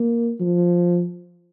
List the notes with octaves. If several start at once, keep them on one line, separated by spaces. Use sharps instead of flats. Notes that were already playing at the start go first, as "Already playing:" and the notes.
Already playing: A#3
F3